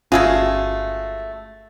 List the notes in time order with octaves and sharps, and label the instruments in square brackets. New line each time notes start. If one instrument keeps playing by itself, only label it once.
[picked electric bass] G1 C#4 [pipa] G#3 A3 G#4 [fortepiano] F4 F#4 F5